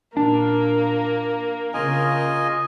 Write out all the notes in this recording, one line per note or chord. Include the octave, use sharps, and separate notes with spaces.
A#2 A#3 D4
C#3 F4 D#5 G#5